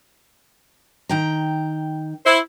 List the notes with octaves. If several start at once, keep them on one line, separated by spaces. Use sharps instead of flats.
D#3 G5 A#5
E4 C5